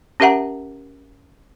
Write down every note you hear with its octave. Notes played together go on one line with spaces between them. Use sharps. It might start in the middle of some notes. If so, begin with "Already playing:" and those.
C#4 G4 A#4 E5 F#5 A#5